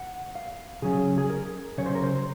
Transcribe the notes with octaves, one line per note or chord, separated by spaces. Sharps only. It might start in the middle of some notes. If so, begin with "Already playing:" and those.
Already playing: F#5
F5
C#3 F#3 C#4 G#4
G#4
A#4
C#3 F#3 C#4 C#5
C5
A#4
C5